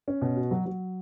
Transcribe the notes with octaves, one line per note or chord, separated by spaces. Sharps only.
C#4
B2
F#4
F#3
F#3